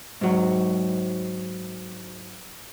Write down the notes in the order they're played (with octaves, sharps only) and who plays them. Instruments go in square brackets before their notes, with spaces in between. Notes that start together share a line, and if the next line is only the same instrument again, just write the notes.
[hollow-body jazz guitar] G#2 F#3